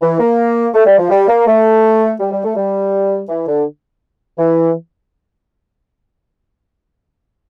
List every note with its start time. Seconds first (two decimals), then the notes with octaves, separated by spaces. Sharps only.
0.02 E3
0.20 A#3
0.74 A3
0.86 G3
0.99 F3
1.10 G3
1.28 A#3
1.47 A3
2.20 G3
2.32 G3
2.44 A3
2.56 G3
3.29 E3
3.47 D3
4.38 E3